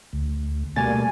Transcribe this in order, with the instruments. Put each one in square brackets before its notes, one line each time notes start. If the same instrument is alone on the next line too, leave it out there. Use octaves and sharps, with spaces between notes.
[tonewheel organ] D2
[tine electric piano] B2 A3 A6 [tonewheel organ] G3 A#3 [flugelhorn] G#5